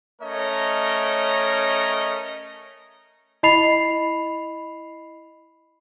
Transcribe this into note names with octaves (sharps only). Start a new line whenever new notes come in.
A3 C#4 A#4 C#5 D#5
E4 D#5 B5 C7 F7